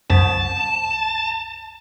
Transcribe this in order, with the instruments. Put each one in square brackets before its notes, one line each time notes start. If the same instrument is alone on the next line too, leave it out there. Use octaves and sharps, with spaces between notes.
[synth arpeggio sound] C2 F#2 [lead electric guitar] A5